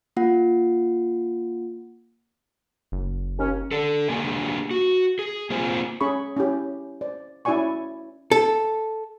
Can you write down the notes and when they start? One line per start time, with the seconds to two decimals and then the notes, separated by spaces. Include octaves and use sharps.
0.17 A#3 F4 F#5
2.92 F#1
3.38 D#2 C#4
3.71 D4 A4
4.10 A#3 D4 G4 A#4 G#5
4.71 F#4
5.19 G#4
5.50 A#3 C4 F4 C5 G#5
6.01 C#4 G#4 B5 C#6
6.37 C#4 E4 G4
7.01 C5 D5
7.45 C#4 E4 F#4 D5 G#5 C#6
8.31 A4